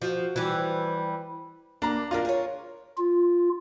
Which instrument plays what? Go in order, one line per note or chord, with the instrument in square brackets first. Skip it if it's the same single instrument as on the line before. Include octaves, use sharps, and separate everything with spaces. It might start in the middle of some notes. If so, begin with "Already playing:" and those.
[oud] F3 [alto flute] F#4
[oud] E3 G3
[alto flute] C5
[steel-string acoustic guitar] A#3 [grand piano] D4 A#5
[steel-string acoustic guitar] D#3 D4 D#4 [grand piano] F4 A#4
[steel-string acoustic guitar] G#4 C#5
[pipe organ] F4